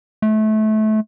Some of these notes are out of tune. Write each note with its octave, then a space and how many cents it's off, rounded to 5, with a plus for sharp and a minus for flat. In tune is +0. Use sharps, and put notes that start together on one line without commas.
A3 -25